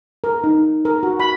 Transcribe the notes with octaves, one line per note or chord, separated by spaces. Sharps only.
A#4
D#4
A#4
F#4
B5